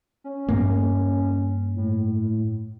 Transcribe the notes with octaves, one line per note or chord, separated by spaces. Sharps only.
C#4
G2 A#3
A2